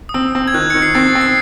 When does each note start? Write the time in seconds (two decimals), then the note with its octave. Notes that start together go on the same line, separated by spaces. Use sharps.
0.09 D#6
0.14 C4 E6
0.35 C4
0.48 G#6
0.54 D#3 F#6
0.70 D#3 C#7
0.82 C7
0.95 C4 A6
1.15 C4
1.21 C7